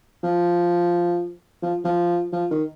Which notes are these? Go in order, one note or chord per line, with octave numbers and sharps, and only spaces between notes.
F3
F3
F3
F3
D#3